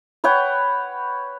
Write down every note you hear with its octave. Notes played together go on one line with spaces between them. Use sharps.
B4 C#5 F#5 G5